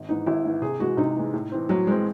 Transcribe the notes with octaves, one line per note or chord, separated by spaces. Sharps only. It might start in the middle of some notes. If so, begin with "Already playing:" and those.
Already playing: G#1
G#2 E3 D#4
G#1 E4
G#2 E3
C3 G#4
E3 G#3 F#4
C3 D#4
E3 G#3
A2
E3 C4
A2 F#3
E3 G#3 C4